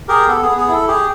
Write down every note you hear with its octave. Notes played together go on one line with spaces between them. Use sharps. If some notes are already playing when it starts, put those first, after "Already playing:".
G4 G#4 A#4
B3 A4
G#4
B3
G#4
E4 A4
G4 G#4